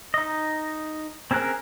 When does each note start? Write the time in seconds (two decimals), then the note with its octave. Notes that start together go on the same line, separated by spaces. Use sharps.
0.14 D#4 D#5
1.31 C4 C#4 G#4 A#4 F#6